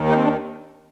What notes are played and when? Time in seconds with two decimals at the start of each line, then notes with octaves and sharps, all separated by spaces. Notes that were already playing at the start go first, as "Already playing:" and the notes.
Already playing: D#2 D#3
0.09 D#4
0.16 C4
0.24 D4